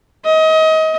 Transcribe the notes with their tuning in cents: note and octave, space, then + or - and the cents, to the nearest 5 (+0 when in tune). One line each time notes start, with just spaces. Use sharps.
D#5 +30